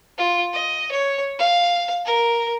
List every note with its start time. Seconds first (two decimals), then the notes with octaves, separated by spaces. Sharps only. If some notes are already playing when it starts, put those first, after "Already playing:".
0.17 F4
0.53 D#5
0.91 C#5
1.39 F5
2.05 A#4